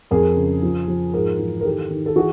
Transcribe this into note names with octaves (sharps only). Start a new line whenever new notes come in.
F2 G#4 A#4
C#3
F3
F3
G#2 G#4 A#4
E3
A#4
D#3 G4 A4
D#3
A4
E3 F#4 G#4